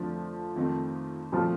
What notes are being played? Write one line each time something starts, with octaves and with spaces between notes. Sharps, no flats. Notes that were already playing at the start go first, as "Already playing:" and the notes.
Already playing: F2 D3 F3 A3 D4
F2 D#3 A3 C4 D#4
A#2 F3 A3 C4 F4